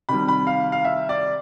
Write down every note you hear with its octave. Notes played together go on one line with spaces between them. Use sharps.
C3 D#3 G3 B5
B5
F5
F5
E5
D5